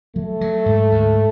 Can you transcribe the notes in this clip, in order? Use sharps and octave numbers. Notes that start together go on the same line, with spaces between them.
F#3 A3
F#3
G#2
D2